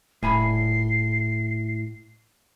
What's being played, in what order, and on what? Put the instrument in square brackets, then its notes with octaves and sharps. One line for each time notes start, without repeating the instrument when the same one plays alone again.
[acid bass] D#1 [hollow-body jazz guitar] A2 G#5 B5 [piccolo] C7